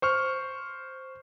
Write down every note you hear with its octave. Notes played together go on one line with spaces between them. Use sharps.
C5 C#6 F6